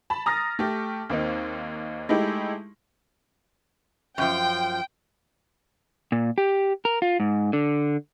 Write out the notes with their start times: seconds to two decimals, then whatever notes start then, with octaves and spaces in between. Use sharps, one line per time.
0.10 A5 B5
0.26 A#5 D#6 F6 A6 A#6
0.59 A3 G4
1.10 D#2 A#3 C4 D#4
2.09 G#3 A3 D#4 E4 G4
4.18 F#2 F3 G5
6.12 A#2
6.38 G4
6.85 A#4
7.02 F4
7.20 G#2
7.53 D3